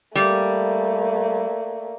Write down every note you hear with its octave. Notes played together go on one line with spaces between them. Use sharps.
G3 A3 A#3